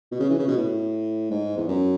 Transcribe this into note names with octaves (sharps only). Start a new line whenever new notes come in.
B2
C#3
E3
C#3
B2
A2
G#2
E2
F#2